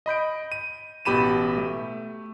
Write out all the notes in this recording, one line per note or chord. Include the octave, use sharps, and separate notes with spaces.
D#5 B5 G6 D7
D#7
A1 B2 G4 B5 D#7 E7
A3